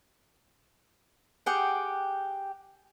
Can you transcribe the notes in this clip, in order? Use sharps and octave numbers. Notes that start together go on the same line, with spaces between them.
G4 G#4 F#5 G5